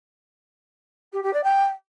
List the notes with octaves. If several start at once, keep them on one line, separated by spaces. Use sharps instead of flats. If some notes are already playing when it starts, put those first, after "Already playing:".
G4
G4
D5
G5